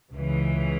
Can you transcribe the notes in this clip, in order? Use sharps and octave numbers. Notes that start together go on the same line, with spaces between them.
C#2 C#3 E3